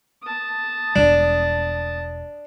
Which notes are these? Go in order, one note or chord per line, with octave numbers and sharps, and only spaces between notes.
A5 D#6
E1 B1 G3 D4